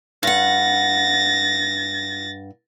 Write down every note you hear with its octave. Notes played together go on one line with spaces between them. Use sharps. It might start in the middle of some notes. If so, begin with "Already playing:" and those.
G2 F#5 A6 A#6